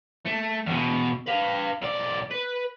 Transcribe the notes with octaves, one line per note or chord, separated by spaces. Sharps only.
A3
E2 B2
B4 F5
B1 D5
B4